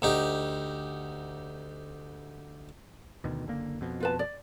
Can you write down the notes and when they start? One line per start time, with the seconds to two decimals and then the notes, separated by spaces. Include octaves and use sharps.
0.02 D2 D#4 G4
3.24 D2 B2 D#3
3.47 F#1 D3 A#3
3.81 F2 B2
4.00 F4 B4 A5
4.19 D5